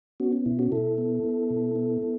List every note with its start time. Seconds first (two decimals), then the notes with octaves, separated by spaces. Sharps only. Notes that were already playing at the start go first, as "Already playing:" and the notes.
0.20 B3 C#4 F#4
0.33 C#4
0.46 B2 E4
0.59 C#4 F#4
0.72 B2 E4 A4
0.98 B3
1.24 B3
1.50 B2
1.76 B3
2.02 B3